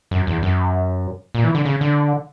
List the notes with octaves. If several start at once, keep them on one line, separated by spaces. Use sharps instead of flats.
F#2
E2
F#2
A#2
E3
D3
C#3
D3